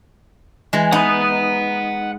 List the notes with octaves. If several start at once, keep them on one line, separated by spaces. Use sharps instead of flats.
E3 G#3
D#4 F#5 B5